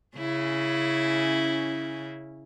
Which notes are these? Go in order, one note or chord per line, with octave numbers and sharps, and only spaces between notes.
C#3 C#4 E4